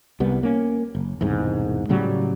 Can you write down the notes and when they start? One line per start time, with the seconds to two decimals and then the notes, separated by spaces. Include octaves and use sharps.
0.20 C2 G3 B3
0.43 A#3 C#4
0.95 F#1
1.21 E1 C2 G#2
1.89 A2 C#3 F#3 G3